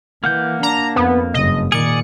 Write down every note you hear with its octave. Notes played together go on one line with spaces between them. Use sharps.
E3 A#3 F#5 G6
D4 A#5
F2 B3
F#1 G2 D#5
A#2 D#3 G#4 D5 C#7